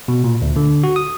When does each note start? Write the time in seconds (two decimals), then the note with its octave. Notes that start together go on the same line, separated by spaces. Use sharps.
0.08 B2
0.24 A#2
0.42 D2
0.56 D3
0.84 F#4
0.96 D#6